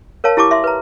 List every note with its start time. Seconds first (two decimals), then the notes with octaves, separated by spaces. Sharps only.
0.24 A#4 C#5 F5 A5
0.37 E4 G4 A5 C#6 D6
0.51 E5 C6
0.64 B4 A#5